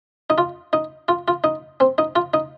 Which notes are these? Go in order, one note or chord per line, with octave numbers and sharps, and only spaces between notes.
D#4
F4
D#4
F4
F4
D#4
C4
D#4
F4
D#4